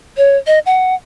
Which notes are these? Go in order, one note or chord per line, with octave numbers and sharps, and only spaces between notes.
C#5
D#5
F#5